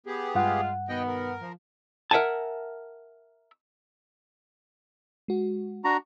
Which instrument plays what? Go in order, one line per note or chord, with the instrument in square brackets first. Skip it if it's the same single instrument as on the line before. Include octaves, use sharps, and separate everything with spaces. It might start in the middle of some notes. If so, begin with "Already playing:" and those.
[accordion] B3 G4 G#4
[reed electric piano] G2 F#5 [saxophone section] G#3 F4
[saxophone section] B2 D#3 B3 [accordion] D#5 G5
[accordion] A#4
[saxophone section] F3
[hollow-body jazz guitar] A#4 E5 F#5 G#5 A5
[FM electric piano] G#3 F#4
[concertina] D4 F#4 A#5